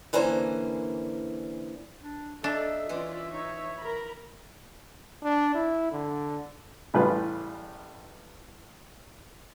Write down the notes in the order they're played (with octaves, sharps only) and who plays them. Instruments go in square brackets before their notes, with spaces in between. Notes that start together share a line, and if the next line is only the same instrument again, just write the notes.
[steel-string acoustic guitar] D3 E3 A#3 C#4 C5
[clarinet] D4
[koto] D4 [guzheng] D#4 [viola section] A4 [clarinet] E5
[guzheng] E3 [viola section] C#4 F4 D5
[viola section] D#4 C#5
A#4 A#5 B5
[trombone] D4
E4
D3
[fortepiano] A1 A2 C#3 G3 F4 B4